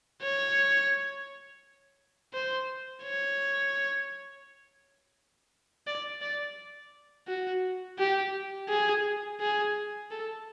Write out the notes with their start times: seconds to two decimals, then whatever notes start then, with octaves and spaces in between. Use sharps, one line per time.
0.22 C#5
2.34 C5
3.04 C#5
5.87 D5
6.22 D5
7.28 F#4
7.99 G4
8.69 G#4
9.40 G#4
10.11 A4